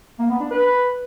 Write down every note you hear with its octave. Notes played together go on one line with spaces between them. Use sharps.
A#3
B3
D4
B4